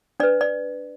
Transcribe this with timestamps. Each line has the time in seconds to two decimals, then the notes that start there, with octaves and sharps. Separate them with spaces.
0.20 D4 B4 D5
0.41 D5